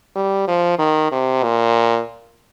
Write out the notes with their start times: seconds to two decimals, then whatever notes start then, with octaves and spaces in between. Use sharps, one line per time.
0.16 G3
0.48 F3
0.79 D#3
1.12 C3
1.43 A#2